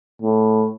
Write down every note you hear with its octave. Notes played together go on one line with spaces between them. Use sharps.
A2